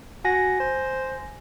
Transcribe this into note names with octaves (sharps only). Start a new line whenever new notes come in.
F#4 G#5 A#6
C5